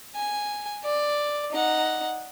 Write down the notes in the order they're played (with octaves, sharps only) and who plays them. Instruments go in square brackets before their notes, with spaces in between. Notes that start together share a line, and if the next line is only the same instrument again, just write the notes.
[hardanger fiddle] G#5
D5
D#4 F#5